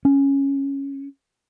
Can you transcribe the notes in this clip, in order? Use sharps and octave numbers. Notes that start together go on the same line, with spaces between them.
C#4